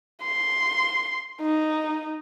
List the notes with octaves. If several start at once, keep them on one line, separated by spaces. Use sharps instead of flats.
C6
D#4